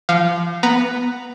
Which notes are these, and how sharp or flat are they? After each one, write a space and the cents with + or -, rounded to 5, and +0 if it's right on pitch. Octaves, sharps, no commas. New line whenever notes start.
F3 -30 F5 -15
B3 +0 A#5 +0